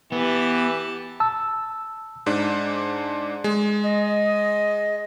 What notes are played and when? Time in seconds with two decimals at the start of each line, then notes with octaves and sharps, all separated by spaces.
0.12 E3 B3 G4 A5
1.20 A5 E6
2.26 G#2 D4
3.44 G#3
3.83 D#5